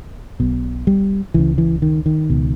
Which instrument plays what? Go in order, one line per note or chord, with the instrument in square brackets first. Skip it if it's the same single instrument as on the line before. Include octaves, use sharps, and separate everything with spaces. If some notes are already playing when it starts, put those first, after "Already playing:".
[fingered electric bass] B1 B2
G3
C#2 C#3 E3
E3
D#3
D#3
C#2 B2